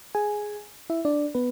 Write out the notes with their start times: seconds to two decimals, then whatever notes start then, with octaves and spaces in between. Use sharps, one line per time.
0.15 G#4 G#5
0.90 E4 E5
1.05 D4 D5
1.35 B3 B4